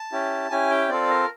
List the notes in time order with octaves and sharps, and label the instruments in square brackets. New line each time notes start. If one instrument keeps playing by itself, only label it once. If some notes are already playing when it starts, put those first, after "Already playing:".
Already playing: [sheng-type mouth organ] A5
C#4 E4 G4
C#4 E4 G4 G#5
G5
C4 F4 A4 D5
A#4